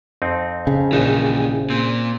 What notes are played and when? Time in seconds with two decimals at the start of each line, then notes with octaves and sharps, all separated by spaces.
0.22 F2 C4 D#4
0.67 C#3
0.93 A#1 D#2 E3 D#4
1.70 A#2 C4